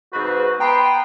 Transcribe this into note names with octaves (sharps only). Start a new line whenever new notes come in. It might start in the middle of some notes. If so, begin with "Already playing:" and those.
G#2 C#3 C4 F#4 B4
B3 G5 A#5 C6